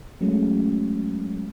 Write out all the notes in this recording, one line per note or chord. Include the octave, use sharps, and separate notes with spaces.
F#3 G#3 A3 C#4